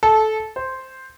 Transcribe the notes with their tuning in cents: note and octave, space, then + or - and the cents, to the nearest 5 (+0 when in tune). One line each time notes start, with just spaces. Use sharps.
A4 -15
C5 +0